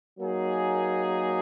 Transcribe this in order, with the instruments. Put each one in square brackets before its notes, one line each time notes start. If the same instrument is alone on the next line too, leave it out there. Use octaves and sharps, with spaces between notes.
[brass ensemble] F#3 A#3 D#4 G#4